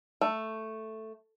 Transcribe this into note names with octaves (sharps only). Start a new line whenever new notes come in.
A3